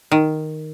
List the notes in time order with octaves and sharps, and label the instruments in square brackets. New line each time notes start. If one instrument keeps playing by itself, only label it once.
[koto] D#3